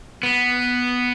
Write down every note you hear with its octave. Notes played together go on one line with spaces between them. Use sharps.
B3